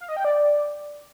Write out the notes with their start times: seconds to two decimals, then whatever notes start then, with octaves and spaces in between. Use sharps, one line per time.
0.01 F5
0.09 D#5
0.17 G5
0.25 D5